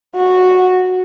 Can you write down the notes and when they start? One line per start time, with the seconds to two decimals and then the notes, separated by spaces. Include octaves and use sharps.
0.15 F#4